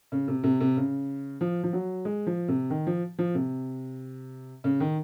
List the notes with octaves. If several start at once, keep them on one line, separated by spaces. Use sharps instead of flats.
C#3
C3
C3
C3
C#3
F3
F3
F#3
G#3
F3
C3
D#3
F3
F3
C3
C#3
D#3